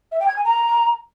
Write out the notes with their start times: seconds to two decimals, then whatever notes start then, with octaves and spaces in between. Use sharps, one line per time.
0.12 E5
0.20 G5
0.28 G#6
0.36 G#5
0.44 A#5